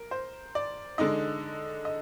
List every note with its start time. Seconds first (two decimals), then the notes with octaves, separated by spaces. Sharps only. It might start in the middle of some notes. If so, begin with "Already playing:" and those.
Already playing: A#4
0.11 C5
0.55 D5
0.98 D3 G#3 D#4 D#5
1.85 D#5